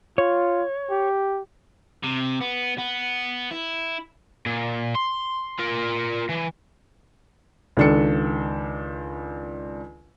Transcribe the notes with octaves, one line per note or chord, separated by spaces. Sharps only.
F4 C#5
G4
C3
B3
B3
E4
A#2
C6
F4 A#4
E3
C#2 D#3 D4 A4 C#7